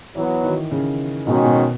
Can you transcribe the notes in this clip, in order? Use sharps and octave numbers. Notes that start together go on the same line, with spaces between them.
E3 F#3 B3 F#4
D#3
C#3
G#2 B2 D#3 G#3 C#4 F#4
B2